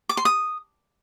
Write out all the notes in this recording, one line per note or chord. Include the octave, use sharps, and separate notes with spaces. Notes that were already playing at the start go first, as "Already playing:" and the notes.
D6
C6
D#6